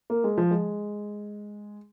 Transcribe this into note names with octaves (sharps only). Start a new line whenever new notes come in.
A#3
G#3
F3
G#3